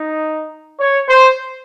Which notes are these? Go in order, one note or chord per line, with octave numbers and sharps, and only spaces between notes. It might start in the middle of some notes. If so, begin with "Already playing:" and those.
Already playing: D#4
C#5
C5